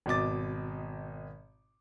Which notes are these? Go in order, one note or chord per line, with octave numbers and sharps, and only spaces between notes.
G#1 B2 D#5 D6 A6